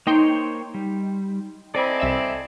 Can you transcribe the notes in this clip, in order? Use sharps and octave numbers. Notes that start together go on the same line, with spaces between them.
A#3 D#4 C5 C#5 G5 C6
G3
C4 E4 A4 D5 D#5 G#5
C2 E5 E7